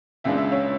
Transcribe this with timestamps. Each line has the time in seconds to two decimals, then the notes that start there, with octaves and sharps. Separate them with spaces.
0.24 C#2 C#3 G#3 D4 E5
0.38 E5
0.52 C#5